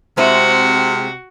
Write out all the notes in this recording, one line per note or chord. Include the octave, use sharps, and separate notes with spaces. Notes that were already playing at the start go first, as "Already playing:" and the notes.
C3 G#3 C4 E4 F#4